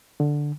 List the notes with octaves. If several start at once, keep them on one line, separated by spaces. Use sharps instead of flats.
D3